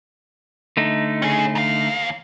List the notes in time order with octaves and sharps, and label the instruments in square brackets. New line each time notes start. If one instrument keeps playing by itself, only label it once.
[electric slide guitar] D3 A3 D#4
[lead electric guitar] C#4 G#4
D#2 F5